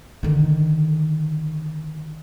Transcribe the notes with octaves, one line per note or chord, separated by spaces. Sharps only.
D3 D#3